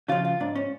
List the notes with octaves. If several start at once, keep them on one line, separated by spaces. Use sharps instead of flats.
C#3 F3 F4
F4
G#2 D4
C#4